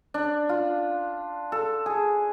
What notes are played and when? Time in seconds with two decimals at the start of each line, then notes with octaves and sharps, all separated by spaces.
0.14 D4
0.49 F4
1.52 A4
1.86 G#4